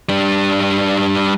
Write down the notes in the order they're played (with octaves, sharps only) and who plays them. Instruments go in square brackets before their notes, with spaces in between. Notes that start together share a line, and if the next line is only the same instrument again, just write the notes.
[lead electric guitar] G3 D4